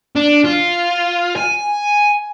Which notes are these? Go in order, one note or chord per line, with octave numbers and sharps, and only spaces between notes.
D4
F4
G#5